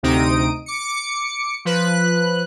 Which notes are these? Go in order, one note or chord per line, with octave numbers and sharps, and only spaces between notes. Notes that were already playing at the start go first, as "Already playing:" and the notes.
D2 C3 C4 D#4 D#6 D7
D6 C#7
F3 B4 F#6